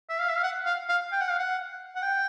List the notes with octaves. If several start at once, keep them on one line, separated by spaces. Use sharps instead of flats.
E5
F5
E5
F5
F#5
F5
F5
G5
F#5
F5
F#5
F#5
G5